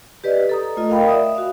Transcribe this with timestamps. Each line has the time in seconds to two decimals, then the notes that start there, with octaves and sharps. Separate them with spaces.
0.24 G4 B4 D5 D#5
0.49 A4 A#5 D#6
0.77 A3 F4 D#5
0.89 A#4 D#5 F5 G5 B5
1.08 D5 E5 D#6
1.35 F#4 F5